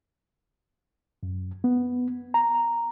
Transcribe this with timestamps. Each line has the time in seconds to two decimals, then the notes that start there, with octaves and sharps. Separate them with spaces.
1.23 F#2
1.64 B3
2.34 A#5